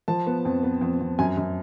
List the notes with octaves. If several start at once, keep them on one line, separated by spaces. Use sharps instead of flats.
F3 A5
B3
F2
B3
F2
F2
F#2 G#5
F#2